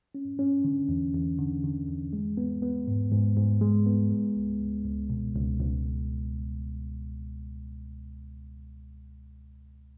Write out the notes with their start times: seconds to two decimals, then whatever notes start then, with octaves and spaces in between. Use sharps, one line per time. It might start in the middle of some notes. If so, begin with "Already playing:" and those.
0.15 C#4
0.39 C#4
0.64 D3
0.88 E2
1.14 E2
1.39 D3
1.64 D3
1.88 E2
2.13 G#3
2.37 B3
2.62 B3
2.88 G#2
3.12 G#2
3.37 G#2
3.61 G#3
3.86 B3
4.11 G#3
4.36 C#2
4.61 C#2
4.85 C#2
5.10 B2
5.35 C#2
5.59 C#2